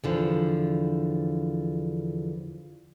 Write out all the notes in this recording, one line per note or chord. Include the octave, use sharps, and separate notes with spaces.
E2 D3 F3